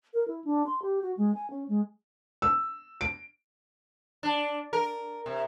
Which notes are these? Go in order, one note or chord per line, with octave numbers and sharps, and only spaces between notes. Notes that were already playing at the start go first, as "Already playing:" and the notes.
A#4
E4
D4
C6
G4
F#4
G#3
G#5
C#4
G#3
E6
D7
D4
A#4
C3